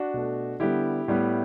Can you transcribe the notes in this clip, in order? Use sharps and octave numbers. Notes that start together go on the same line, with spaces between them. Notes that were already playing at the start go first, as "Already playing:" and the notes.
Already playing: D4 F#4
B2 A3
D3 G3 B3 E4 G4
A2 G3 B3